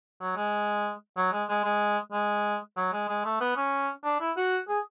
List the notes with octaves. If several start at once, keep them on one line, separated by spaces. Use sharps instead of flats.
F#3
G#3
F#3
G#3
G#3
G#3
G#3
F#3
G#3
G#3
A3
B3
C#4
D4
E4
F#4
G#4